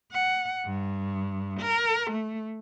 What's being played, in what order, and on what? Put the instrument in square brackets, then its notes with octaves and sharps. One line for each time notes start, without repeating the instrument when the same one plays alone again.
[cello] F#5
G2
A#4
A3